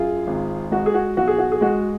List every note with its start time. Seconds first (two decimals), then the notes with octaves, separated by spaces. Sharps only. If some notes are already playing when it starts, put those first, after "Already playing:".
Already playing: F#2 F4 G#4
0.27 G#1
0.71 G#3 F#4
0.86 G#4
0.94 F#4
1.17 B1 F#4
1.28 G#4
1.39 F#4
1.52 G#4
1.61 G#3 F#4